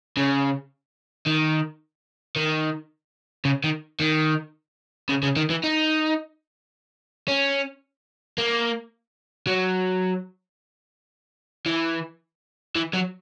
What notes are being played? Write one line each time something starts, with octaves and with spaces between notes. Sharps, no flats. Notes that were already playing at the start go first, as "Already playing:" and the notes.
C#3
D#3
D#3
C#3
D#3
D#3
C#3
C#3
D#3
E3
D#4
C#4
A#3
F#3
E3
E3
F#3